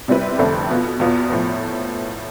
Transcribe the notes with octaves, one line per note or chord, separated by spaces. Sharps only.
C3 G3 C4 E4 B4
F1 F2 D3 A3 C4
B2 B3 F4
E2 B2 B3 F4
A2 F3 B3